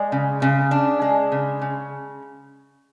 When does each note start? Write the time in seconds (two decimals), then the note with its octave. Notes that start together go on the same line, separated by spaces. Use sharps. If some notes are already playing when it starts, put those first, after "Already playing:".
Already playing: G#3 D5
0.12 C#3
0.42 C#3
0.71 D4
1.02 G#3
1.32 C#3
1.62 C#3